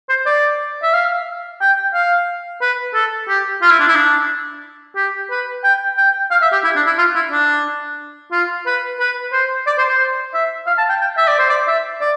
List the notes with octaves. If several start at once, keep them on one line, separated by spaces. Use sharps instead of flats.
C5
D5
E5
F5
G5
F5
B4
A4
G4
F4
E4
D4
E4
D4
G4
B4
G5
G5
F5
E5
G4
E4
D4
E4
F4
E4
D4
F4
B4
B4
C5
D5
C5
C5
E5
F5
A5
G5
G5
E5
D5
C5
D5
E5
D5